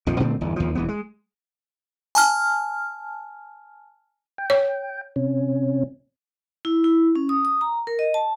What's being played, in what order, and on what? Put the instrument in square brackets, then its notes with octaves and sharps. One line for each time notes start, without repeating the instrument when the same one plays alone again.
[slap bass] A#1 F2 D#3 F3
A#2 D3 A3 C4
G1 E2
D#2 F3
E1 E3 B3
G#3
[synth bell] G#5 A5 F6
[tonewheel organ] G5
[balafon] C#5
[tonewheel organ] C3 C#4
[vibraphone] E4
E4
C#4
D#6
D#6
A#5
A#4
D#5
A5